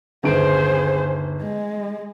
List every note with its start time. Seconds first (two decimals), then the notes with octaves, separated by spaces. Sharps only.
0.24 G1 D#2 G#4 C5 D7
1.41 G#3